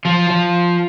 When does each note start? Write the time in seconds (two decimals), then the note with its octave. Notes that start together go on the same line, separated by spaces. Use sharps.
0.05 F3 F4
0.30 F3